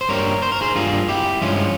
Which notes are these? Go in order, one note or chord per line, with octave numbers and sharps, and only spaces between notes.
C5
G2 G3 A#3 A#4 C#5
C5
A#4
G#4 C5
G2 G3 A#3 F4 G#4
E4 G4
G2 F3 G#3 C#4 F4